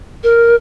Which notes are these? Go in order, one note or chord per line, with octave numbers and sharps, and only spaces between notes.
A#4